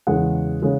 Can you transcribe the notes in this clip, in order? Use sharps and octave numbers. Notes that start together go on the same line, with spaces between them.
E2 C#3 G#3 F#5
C#3 G#3